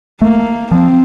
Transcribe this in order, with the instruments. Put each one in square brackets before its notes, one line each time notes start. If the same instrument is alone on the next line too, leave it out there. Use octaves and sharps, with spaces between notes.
[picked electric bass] A3 [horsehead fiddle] A#3
[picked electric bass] F3 [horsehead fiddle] C4